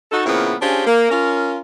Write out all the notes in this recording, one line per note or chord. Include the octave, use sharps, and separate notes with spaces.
D#4 F#4 A4
A#2 C#3 F3 B3 C4 E4
C#4 D4 F4 G4 G#4 C5
A#3
C#4 F4 A#4